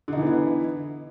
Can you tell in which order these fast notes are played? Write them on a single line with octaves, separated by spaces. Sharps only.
D3 D#4 E3 B3 E4